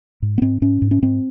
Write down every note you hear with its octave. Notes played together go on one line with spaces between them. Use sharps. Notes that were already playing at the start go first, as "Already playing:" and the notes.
G#2
B3
G#2 C4
G#2 C#4
G#2
C#4
G#2 C4